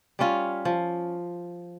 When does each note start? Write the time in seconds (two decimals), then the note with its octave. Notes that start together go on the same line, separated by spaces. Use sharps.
0.19 G3 C#4 F4
0.65 F3